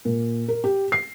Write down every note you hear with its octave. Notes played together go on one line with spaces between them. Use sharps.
A#2
A#4
G4
C7